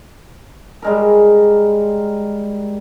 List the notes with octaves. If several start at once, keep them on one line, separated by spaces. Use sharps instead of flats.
G3 G#3 A#4